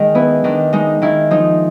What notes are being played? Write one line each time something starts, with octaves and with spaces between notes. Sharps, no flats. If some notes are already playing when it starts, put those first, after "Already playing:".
Already playing: D#3 G#3
B3 E4
D#3 D4
G#3 D#4
D#3 E4
F3 D#4